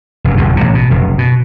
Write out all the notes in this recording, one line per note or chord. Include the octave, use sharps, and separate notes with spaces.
F1 F#2
G1 F2 B2 D3
A1 C3
B2
F1 F#2
B2